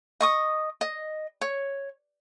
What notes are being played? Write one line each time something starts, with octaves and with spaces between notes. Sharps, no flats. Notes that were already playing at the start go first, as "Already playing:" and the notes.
D#5 C#6 D#6
D#5
C#5